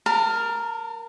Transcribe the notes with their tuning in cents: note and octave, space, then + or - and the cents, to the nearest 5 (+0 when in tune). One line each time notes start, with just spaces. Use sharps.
A#4 +0 A5 +40